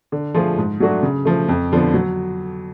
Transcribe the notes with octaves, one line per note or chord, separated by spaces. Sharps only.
D3
F3 A3 F4 G#4
G#2
F#3 A3 D4 F#4
C#3
F3 A3
F2
D3 F3 B3
F#3